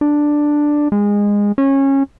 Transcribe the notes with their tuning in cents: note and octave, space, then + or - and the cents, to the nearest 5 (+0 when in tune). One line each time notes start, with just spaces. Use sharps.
D4 +5
G#3 -20
C#4 -20